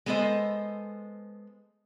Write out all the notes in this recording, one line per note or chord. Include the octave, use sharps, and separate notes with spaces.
G#3 B3 A4 C5 D#5